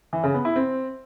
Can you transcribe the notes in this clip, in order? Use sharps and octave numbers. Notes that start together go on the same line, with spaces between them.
E3
C#3
B3
E4
C4